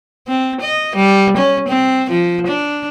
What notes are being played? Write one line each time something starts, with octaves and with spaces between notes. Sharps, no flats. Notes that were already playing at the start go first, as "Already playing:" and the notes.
C4
D#5
G3
C#4
C4
F3
D4